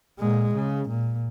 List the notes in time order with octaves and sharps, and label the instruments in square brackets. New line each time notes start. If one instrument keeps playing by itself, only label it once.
[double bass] A#2 G#3
C#3
A#2